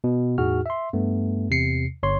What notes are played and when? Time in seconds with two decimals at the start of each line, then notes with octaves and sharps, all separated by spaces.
0.04 B2
0.38 E2 A2 D#4 F#4 G#4 F6
0.66 E5 C6
0.93 G2 A3 B3
1.50 E2 C3 C7 C#7
2.03 G1 C#5 C6